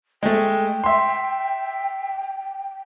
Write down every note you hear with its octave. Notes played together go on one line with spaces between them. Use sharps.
G#3 A3 G5
E5 C6